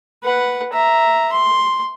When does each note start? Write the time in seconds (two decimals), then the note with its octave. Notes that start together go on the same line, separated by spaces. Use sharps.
0.23 B4 F#5
0.73 E5 A#5
1.33 C6